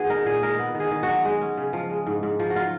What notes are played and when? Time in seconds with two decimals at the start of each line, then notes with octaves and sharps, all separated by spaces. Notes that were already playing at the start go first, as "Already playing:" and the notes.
Already playing: D#3 B3 F#4 G#4
0.10 D#4 A#4
0.25 A#2 G#4
0.42 G#3 A#4
0.59 B3
0.75 D#3
0.80 G#4
0.91 D#3
1.03 F#4
1.08 F#3
1.25 G#3
1.41 C#4
1.57 C#3
1.73 F3
1.90 G#3
2.06 G#2
2.23 G#2
2.40 F3
2.50 F#4
2.55 F#3 F4